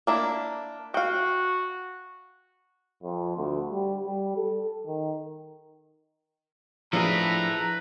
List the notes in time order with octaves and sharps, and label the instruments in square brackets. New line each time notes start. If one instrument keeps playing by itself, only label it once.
[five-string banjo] A#3 D4 E4
[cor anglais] F#4 [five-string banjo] F5 G5
[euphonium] F2
D2
G3
G3
A4
D#3
[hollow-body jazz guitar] F3 D4 G#4 [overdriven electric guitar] E4 A4 [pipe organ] B4 [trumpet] A#5